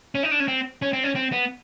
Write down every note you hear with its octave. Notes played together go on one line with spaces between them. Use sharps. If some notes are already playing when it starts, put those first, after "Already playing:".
C#4
D#4
D4
C#4
C4
C#4
C4
C#4
C4
B3